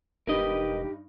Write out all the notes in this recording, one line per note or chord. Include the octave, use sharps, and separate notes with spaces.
E1 G2 D#4 G4 A#4 B4 D#5